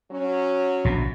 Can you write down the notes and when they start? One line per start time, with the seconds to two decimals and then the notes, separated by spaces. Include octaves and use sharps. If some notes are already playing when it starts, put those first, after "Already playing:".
0.12 F#3 C#4
0.85 A#1 B2